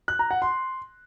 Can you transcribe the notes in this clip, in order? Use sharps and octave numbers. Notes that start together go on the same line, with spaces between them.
F#6
A#5
F#5
C6